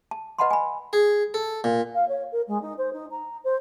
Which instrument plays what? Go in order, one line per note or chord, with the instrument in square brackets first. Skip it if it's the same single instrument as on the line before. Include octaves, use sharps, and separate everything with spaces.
[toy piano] A5
B4 D#5 F#5 A5 B5 C6
G#5 B5
[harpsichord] G#4
A4
A#2
[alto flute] F5
C#5
A#4
G#3
D#4
C5
D#4
A#5
C5